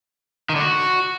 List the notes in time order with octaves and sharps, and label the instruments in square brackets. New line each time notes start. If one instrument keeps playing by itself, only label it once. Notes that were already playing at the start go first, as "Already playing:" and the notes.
[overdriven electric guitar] D#3
D3
F#4